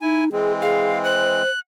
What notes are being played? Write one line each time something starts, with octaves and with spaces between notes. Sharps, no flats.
D#4 E4 G#5
E3 G#3 C4 G#4
G#4 F5
C5 F#6